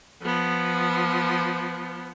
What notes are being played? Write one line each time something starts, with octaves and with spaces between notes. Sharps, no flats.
F3 B3